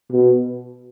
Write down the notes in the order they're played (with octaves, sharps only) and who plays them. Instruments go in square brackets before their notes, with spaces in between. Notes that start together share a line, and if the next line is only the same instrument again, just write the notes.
[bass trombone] B2